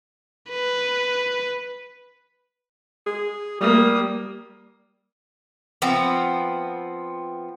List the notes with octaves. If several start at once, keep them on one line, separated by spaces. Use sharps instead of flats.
B4
G#4
G3 A#3 D#6
F3 B3 C4